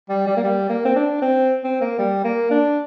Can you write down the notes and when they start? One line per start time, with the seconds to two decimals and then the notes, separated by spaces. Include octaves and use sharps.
0.09 G3
0.27 G3
0.37 A#3
0.43 G3
0.69 A#3
0.85 C4
0.96 D4
1.21 C4
1.64 C4
1.81 A#3
1.98 G3
2.24 A#3
2.51 D4